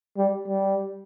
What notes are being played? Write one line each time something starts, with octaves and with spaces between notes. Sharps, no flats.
G3
G3